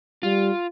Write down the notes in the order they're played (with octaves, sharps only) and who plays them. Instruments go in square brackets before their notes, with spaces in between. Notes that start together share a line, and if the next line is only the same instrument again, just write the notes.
[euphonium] G3 [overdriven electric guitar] F4